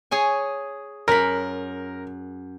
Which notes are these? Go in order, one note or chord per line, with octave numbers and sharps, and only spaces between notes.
G#4 C#5 G#5
F#2 A#4 B5